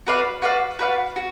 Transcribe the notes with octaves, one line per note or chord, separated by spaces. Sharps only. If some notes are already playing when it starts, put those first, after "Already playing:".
F#4 B4 D5 F5
F#4 B4 D5 F5
F#4 B4 D5 F5
F#4